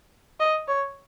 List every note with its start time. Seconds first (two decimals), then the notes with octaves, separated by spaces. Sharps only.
0.40 D#5
0.68 C#5